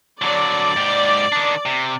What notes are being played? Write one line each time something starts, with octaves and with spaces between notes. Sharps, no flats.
D3 F#3 D5
G#2 G4
D#3 D4
C3